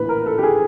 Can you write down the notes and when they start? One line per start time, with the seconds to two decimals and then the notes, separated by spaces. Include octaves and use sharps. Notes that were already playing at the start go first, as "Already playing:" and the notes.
Already playing: A#1 A2 E3 B4
0.09 A#4
0.26 A4
0.38 G4
0.43 G#4